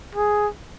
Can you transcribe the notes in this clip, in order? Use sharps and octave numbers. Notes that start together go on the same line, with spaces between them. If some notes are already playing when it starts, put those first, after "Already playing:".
G#4